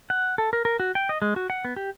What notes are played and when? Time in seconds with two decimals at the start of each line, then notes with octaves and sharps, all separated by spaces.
0.10 F#5
0.38 A4
0.53 A#4
0.65 A#4
0.80 F#4
0.95 G5
1.09 D#5
1.22 G#3
1.36 F#4
1.50 F#5
1.65 B3
1.76 G4